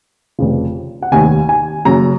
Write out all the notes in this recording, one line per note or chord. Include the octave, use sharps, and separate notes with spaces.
F1 F2 C#3 F3
F#5
F1 D#2 D#3 G#5
G#5
F#1 F#2 C#3 A#5